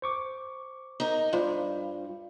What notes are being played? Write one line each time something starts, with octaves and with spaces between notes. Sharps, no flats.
C5 C#6 D6
D#4 A#4
G2 F4 C5